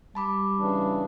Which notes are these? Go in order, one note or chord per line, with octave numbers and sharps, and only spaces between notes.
G3 A5 B5 D6
C#3 E3 D4